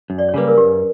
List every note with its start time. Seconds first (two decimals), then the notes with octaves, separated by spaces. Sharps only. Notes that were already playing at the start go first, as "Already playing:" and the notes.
0.10 F#2
0.18 D5
0.29 C#5
0.34 C#3 G3 A#3 B4
0.48 A#4
0.58 F#2 G4